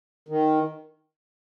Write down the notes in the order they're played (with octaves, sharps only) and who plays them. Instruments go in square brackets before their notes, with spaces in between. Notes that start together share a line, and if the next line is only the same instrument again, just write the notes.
[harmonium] D#3